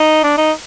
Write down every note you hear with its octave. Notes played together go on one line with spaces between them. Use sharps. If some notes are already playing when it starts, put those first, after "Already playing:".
Already playing: D#4
D4
D#4